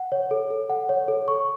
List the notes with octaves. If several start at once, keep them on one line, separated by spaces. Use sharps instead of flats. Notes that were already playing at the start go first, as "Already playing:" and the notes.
Already playing: F#5
C#5
A4
A4
F#5
C#5
A4
C#6